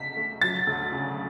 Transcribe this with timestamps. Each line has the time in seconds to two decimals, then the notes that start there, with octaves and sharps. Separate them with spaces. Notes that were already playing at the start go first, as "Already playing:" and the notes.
Already playing: D2 C#3 B6
0.17 A3
0.42 F#3 A6
0.67 D2
0.92 C#3